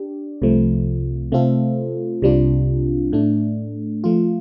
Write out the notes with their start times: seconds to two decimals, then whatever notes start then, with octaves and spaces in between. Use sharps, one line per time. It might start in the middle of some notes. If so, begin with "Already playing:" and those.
Already playing: D4 G4
0.42 C2 C3 F3 A3
1.32 C3 A3 C4 F4 A4
2.22 C2 C3 G3 D4 F4
3.12 A2 A3 D4
4.04 F3 A3 F4